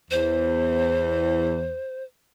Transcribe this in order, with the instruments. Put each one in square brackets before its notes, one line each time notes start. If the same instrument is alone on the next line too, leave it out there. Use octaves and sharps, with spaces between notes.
[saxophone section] E2 [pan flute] C5